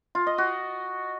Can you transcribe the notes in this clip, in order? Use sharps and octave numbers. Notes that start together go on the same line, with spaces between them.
F4
D#5
F#4